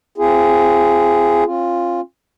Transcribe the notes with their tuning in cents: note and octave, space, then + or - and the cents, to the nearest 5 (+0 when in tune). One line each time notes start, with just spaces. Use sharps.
C4 +0 F4 -35 G#4 +0
C#4 -45 F4 +0